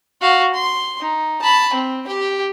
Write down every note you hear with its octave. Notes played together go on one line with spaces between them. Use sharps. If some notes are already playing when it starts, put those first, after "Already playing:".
F#4 F5
C6
D#4
A5 B5
C4
G4 G5